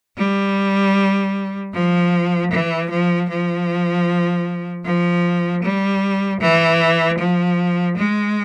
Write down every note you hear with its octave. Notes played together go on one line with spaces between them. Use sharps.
G3
F3
E3
F3
F3
F3
G3
E3
F3
G#3